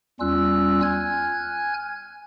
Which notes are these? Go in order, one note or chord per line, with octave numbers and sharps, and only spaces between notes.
E2 G3 C#4 F4 E6 F#6
G#5 F6 F#6 G#6